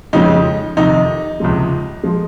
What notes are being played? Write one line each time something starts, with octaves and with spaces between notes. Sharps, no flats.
F2 C#3 G#3 D#4
F2 C3 D#3 D#4
C#2 C3 F3 G#3
F3 G#3